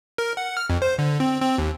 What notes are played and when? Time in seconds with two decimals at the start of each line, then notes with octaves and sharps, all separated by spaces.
0.18 A#4
0.37 F#5
0.57 F6
0.70 F2
0.82 C5
0.99 D3
1.20 C4
1.41 C4
1.58 D#2